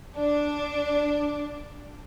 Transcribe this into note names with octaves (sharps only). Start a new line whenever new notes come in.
D4